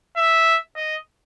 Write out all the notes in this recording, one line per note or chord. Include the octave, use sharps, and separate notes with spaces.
E5
D#5